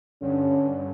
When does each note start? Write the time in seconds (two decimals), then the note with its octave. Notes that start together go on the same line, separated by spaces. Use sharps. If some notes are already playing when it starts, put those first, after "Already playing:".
0.22 G2 D3 C#4